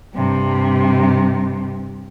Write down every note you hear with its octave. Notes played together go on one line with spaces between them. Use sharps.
G2 C3